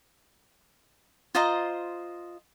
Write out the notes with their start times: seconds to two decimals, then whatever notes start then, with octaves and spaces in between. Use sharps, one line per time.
1.35 F4 C5 D#5 A#5